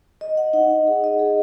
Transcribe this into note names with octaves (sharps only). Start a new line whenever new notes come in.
D#5
F#5
D#4
F#5
G#4
D#5
G#4